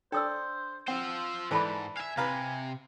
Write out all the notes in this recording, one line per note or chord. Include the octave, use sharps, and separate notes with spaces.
D4 A4 C5 D5 D#6 E6
C4 F4 C5 F#5 E6
G#2 E3 A4 C5 D5 A5 B5
E5 F5 G#5
C3 B4 F5 A#5